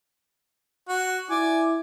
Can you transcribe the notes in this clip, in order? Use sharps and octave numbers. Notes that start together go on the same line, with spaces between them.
F#4
E4 D5 G#5